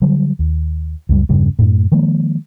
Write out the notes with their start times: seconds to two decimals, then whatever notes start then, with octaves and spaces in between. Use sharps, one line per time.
0.02 D3 F#3 G3
0.39 D#2
1.09 C#2 F#2 G3
1.29 E2 G2 C#3 G3
1.59 F#2 A2
1.92 D#3 F3 G#3 A#3